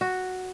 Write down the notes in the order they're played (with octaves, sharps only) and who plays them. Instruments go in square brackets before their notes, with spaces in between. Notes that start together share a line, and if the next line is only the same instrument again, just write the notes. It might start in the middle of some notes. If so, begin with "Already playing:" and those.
[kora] F#4